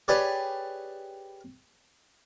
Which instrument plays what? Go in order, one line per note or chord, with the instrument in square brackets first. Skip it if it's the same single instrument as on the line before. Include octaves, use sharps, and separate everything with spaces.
[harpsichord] G4 G#4 B4 C#5 D5